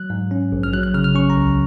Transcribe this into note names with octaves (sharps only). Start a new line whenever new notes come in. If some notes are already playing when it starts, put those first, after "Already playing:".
Already playing: F#3 F#6
G#2
C#4
A#1
F6
F#3 F#6
F#6
C#3 F6
F6
C#4 C#6
A#5
C#2